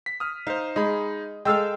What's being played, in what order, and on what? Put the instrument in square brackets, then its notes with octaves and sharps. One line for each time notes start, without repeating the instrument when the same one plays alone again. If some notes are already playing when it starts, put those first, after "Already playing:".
[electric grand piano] B6
D#6 F6
[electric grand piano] D#4 C5 [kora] F5
[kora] G#3 [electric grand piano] D#4 G#4 B5
[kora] G#3 A4 F5 [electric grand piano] G5 E6 F6